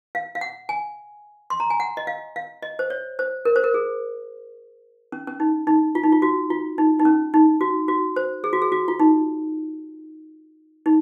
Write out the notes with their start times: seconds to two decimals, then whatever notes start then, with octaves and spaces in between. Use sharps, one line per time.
0.15 F5
0.35 F5
0.41 F#5
0.69 G#5
1.50 C6
1.60 A#5
1.70 G#5
1.80 F#5
1.97 D#5
2.07 F5
2.36 F5
2.62 D#5
2.79 C5
2.90 C#5
3.19 C5
3.45 A#4
3.56 C5
3.64 A#4
3.74 G#4
5.12 C#4
5.27 C#4
5.40 D#4
5.67 D#4
5.95 F4
6.03 D#4
6.12 F4
6.22 F#4
6.50 F4
6.78 D#4
6.99 D#4
7.05 C#4
7.34 D#4
7.61 F#4
7.88 F#4
8.16 C5
8.44 G#4
8.53 F#4
8.62 G#4
8.72 F#4
8.88 F4
9.00 D#4
10.86 D#4